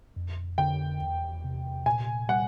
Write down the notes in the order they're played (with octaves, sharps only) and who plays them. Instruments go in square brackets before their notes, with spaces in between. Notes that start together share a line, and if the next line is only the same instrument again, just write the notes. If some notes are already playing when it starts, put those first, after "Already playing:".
[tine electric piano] F2
[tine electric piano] D3 [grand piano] G5
[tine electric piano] E2
C3
[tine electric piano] A#2 [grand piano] G#5
[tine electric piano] G3 [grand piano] F#5